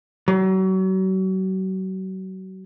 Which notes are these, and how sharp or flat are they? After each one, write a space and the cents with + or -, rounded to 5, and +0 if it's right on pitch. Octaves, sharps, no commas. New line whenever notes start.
F#3 +35